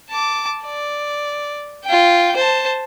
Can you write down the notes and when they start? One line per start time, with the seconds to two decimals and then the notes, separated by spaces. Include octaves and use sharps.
0.11 A5 D6
0.65 D5
1.85 F4 G5
2.36 C5 A5